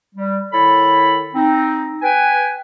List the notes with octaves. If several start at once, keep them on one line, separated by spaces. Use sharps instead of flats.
G3
D#3 E4 A4 C#5 B5
C4 D#4
B4 G5 G#5